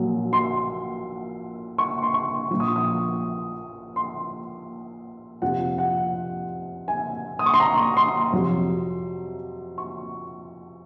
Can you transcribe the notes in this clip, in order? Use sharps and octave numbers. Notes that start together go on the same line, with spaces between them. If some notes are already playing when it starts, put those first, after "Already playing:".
Already playing: A#1 A#2 F#3
C6
C#6
C6
C#6
A#1 A#2 F3
D#6
C#6
D#6
C6
F2 C3 F3 F#5
F#5
G#5
D#6
C#6
C6
A#5
C6
F2 C3 F#3
C#6